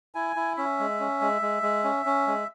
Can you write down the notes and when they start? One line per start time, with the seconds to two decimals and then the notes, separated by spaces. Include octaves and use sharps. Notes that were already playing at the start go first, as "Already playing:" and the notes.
0.15 E4 G#5
0.36 E4
0.57 C#4 E5
0.79 G#3
1.00 C#4
1.21 G#3
1.42 G#3
1.62 G#3
1.84 C#4
2.06 C#4
2.27 G#3